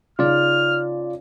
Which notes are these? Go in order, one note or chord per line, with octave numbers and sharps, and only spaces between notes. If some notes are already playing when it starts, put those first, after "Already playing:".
C#3 D#4 F4 D5 F6